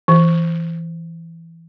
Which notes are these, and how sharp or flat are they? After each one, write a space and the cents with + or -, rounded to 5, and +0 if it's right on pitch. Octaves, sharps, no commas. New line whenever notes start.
E3 +10